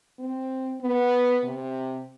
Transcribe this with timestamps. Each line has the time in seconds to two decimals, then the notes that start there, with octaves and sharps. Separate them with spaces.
0.20 C4
0.81 B3
1.43 C3